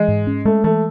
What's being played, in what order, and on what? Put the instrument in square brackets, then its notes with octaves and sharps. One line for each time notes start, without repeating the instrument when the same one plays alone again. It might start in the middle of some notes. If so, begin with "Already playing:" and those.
Already playing: [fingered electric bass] E3 [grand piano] G#3
[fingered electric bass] G#2
C#4
[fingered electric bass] G#3 [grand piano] A3
[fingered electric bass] E3 [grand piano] A3